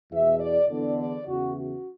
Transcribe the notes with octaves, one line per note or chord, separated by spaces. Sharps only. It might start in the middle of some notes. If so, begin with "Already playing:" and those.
E2 B2 E5
D5
E2 D3 D5
D5
E2 C#3 E3 F#4
F#4